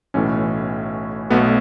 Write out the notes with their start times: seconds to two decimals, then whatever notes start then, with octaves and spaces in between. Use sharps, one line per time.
0.14 B1 A2 E3 A3 C#4
1.30 B1 B2 A3 B3